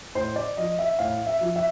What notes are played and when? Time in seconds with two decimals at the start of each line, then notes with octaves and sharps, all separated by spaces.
0.15 A2 C5
0.36 D5
0.57 F3 D#5
0.79 E5
0.99 A2 F5
1.27 E5
1.41 F3
1.56 E5